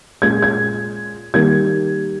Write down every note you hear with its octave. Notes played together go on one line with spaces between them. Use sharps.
A#2 G#3 C#4 G#6
G#6
D#3 G3 A#3 G#6